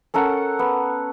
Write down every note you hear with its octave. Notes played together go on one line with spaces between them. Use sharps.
C#4 A4 A#4 F#5
B3